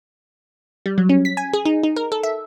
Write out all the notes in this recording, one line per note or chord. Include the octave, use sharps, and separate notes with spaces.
G3
F#3
C#4
B6
G#5
G#4
D#4
D#4
A#4
A4
E5